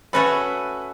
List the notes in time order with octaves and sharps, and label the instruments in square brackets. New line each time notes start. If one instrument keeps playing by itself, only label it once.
[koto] A3 C#4 F#4 A4 [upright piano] B4 B5